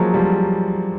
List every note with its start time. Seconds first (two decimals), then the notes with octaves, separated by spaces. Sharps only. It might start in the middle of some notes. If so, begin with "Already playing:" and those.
Already playing: F3 F#3 G#3 A#3
0.14 F3 G3